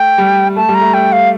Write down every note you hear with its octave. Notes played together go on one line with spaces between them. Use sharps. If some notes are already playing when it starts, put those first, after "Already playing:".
Already playing: A3 G5
G3
A3 A5
G3
A#5
A3
A3 G5
F5